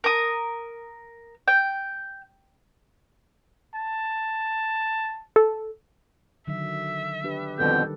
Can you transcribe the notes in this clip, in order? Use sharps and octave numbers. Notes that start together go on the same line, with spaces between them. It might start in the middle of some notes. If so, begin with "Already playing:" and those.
A#4 D#6
G5
A5
A4
D3 D#3 F#3 E5
D4 G4 B4
F2 B2 D3 D#3 G3 A4 G5